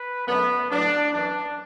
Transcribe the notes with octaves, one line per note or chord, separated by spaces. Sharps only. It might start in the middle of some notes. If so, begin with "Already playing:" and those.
Already playing: B4
F#2 D3 A3 B3
A2 F#3 B3 D4
F#2 E3 B3 D4